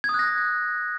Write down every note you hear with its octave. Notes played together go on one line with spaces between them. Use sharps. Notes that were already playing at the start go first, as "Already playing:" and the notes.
D#6 F#6 G#6 A#6